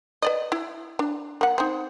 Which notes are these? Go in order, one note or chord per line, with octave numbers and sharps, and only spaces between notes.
B4 D5 D#5
E4
D4
A#3 F#5
C4 D#4